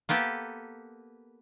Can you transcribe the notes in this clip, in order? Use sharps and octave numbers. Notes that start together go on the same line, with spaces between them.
A#3 B3 G4 A4